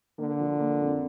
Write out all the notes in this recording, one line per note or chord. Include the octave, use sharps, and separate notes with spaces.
D3 A#3
F3
A#3
F2